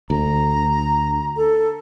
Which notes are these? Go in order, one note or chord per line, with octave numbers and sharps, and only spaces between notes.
D2 A#5
A4